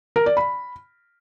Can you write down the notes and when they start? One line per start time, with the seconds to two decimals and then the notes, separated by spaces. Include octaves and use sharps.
0.16 A#4
0.26 D5
0.37 B5